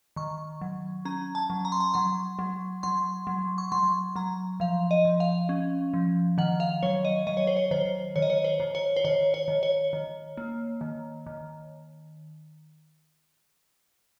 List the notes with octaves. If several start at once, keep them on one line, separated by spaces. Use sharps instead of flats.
D#3 C#6
F#3
C#4 A#5
A5
F#3
A#5
C6
A#5
F#3 C6
F#3
F#3 C6
F#3
C#6
F#3 C6
F#3 A#5
F3 F5
D#5
F3
F5
C#4
F3
D#3 F#5
F5
F#3 C#5
D#5
F#3 D#5
C#5
C5
C#5
D#3 C5
D#3 C#5
D#5
C#5
C5
D#3
C#5
C5
D#3 C#5
C#5
D#3
C#5
D#3
A#3
D#3
D#3